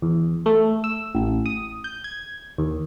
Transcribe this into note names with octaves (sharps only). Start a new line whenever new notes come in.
E2
A3
E6
A1
D#6
G6
G#6
D#2